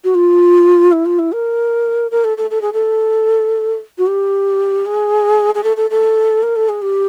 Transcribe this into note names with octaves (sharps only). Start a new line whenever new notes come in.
F#4
F4
E4
F4
E4
A#4
A#4
A4
A4
A4
G#4
A4
F#4
G4
G#4
G#4
A4
A4
A4
A#4
A4
G#4
G4